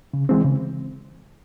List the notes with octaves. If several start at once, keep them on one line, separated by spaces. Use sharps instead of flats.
C#3
E3 G#3 C4
C#3